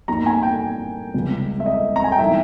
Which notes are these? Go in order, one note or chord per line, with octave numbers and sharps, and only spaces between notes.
G2 G3 A#3 D#4 A#5
G#5
G5
C#2 C#3 G3
E5
D#5
A#5
G#5
G5
E3 G3 B3 D#4 E5